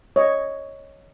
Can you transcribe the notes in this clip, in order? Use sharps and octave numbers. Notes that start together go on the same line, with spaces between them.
C#5 D#5